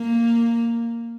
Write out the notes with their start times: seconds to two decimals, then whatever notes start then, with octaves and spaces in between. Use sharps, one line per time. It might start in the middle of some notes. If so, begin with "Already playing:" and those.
Already playing: A#3